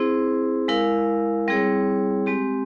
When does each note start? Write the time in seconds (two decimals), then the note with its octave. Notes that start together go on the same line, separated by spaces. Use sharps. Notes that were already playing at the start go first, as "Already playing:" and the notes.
Already playing: C4 E4 G#4 C5
0.68 G#3 E4 A#4 F5
1.48 G3 C4 E4 G#4 C#5
2.26 G#3 C4 G4